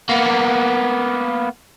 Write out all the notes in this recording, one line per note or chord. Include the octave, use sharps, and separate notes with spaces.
A#3 B3